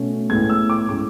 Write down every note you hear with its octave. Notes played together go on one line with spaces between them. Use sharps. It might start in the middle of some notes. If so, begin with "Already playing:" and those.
Already playing: B2 A3 C#4
A2 G#3 B3 G#6
E6
D6
A2 G#3 C#4 D6